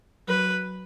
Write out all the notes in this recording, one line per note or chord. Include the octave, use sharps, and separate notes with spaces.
F#3 B4